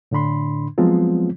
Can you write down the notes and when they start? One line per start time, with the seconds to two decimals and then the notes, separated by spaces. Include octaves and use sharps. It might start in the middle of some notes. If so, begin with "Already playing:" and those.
0.12 A2 D3 D4 B5 C6
0.78 F3 F#3 G#3 B3 C4 F4